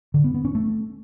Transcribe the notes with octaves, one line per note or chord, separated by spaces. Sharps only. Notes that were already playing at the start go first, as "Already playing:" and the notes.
D3
B3
B3
C#4
A3